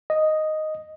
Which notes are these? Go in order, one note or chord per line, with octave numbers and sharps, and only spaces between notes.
D#5